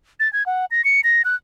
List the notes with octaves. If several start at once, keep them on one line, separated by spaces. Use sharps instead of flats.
A6
G#6
F#5
A#6
C#7
A#6
F#6